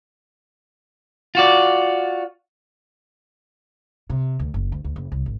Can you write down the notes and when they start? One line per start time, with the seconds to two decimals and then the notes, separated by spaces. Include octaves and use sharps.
1.35 F4 F#4 D5
4.10 C3
4.39 D2
4.54 F#1
4.72 D2
4.84 D2
4.96 F#1
5.12 C2
5.26 G#1